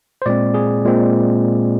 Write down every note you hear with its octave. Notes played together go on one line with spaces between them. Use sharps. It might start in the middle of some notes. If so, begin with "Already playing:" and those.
C5
A#2 G#3 C4 D5
G#4
A#2 G#3 C4